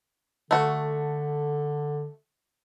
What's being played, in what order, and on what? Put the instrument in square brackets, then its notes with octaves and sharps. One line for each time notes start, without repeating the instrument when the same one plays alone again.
[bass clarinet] D3 [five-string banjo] A3 F#4